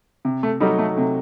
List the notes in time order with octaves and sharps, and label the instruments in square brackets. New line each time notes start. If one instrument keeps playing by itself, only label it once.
[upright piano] C3
[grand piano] A3
[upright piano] F#3 A3 D#4 [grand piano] G3
[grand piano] A3
[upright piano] C3 [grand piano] A3